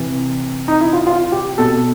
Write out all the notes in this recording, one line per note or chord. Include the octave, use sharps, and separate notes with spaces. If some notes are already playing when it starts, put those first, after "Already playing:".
Already playing: C3 E3
D#4
E4
F4
F4
G4
B2 A4